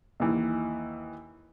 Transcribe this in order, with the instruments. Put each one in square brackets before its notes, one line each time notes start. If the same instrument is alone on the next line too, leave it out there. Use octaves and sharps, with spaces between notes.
[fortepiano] D#2 E3